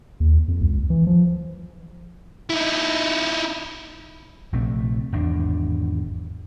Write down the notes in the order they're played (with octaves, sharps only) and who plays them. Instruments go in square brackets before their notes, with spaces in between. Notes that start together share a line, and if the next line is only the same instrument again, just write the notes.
[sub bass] D#2
F2
C#2
E3
F3
[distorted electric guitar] D#4 E4
[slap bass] A#1 C3 A3 C4
G#1 E2 D4